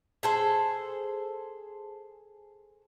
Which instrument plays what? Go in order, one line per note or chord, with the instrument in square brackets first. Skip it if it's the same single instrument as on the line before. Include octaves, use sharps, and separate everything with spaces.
[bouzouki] G#4 A4 C5